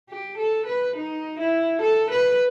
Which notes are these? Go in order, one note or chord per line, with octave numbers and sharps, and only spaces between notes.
G4
A4
B4
D#4
E4
A4
B4